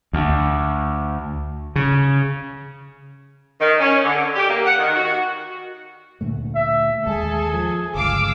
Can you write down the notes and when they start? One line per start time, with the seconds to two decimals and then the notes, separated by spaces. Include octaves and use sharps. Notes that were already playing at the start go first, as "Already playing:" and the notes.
0.13 D2
1.76 C#3
3.60 D#3
3.80 C#4
4.03 D3
4.35 G4
4.49 A#3
4.66 F#5
4.79 D#3
4.95 F#4
6.21 D2 A#2 A3
6.55 E5
7.07 D#2 G#3 G#4 A4 G#5
7.53 F3
7.95 G1 C#2 F5 D6 E6